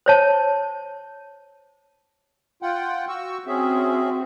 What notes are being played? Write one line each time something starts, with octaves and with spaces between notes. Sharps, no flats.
C5 C#5 A5
F4 F#5 G5
F#4 C#6 E6
C4 C#4 F#4 G#4 E5